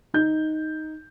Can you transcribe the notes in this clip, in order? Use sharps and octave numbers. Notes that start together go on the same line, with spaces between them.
D#4 G6